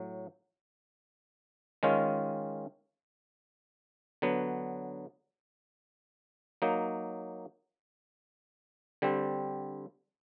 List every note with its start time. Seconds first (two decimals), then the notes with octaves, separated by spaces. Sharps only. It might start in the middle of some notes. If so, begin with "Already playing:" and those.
Already playing: A2 F#3
1.83 D#3 G#3 C#4 F4
4.22 D3 F#3 B3
6.62 F#3 A#3 D#4
9.02 D3 G3 C4